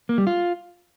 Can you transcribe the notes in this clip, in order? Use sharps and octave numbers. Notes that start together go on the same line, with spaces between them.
A#3
G3
F4